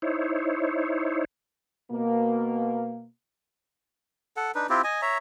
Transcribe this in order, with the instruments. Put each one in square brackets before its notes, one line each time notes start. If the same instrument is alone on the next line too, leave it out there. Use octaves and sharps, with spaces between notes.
[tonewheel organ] D#4 E4 C5 C#5
[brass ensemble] B2 A#3
[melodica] A4 F#5
D4 D#4 B4
C4 E4 F4 G4
D#5 G#5
C#5 E5 A#5